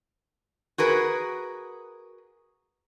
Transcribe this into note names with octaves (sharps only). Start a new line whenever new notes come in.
F#4 G#4 A#4 B4